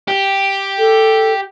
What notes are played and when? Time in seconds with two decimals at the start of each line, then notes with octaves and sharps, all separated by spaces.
0.08 G4
0.79 A4